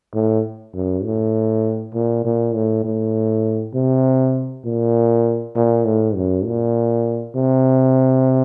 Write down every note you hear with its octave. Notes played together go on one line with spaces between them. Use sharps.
A2
F#2
A2
A#2
A#2
A2
A2
C3
A#2
A#2
A2
F#2
A#2
C3